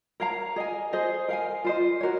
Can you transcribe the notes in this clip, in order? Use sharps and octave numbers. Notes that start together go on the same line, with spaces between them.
A#4 C#5 F5 A#5
G#4 D#5 G#5
G#4 C5 D#5 G#5
A#4 F5 G#5
F4 C5 D#5
F#4 A#4 C#5